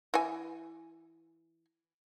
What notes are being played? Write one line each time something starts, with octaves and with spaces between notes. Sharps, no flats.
E3 G#5